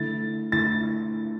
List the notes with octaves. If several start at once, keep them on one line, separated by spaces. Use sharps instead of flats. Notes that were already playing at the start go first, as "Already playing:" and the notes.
Already playing: D3 A3 E4 A6
D3 A3 E4 A6